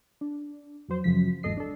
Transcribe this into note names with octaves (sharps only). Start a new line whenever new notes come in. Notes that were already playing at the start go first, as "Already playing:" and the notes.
D4
F2 F#3 C5
F#2 C#3 F3 B6
G#1 E2 A4 D#5 C7
D4 A4